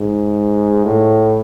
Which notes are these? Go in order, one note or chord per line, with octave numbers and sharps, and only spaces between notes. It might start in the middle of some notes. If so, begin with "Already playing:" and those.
Already playing: G#2
A2